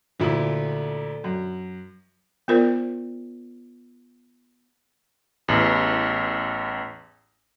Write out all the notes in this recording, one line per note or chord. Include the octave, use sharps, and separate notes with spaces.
D2 A#2 D3 E4
F#2
B3 F4 A#4 C5 D5
A1 E2